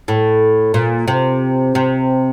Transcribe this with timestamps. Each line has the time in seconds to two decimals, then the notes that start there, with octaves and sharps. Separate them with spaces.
0.08 A2
0.74 A#2
1.08 C3
1.75 C3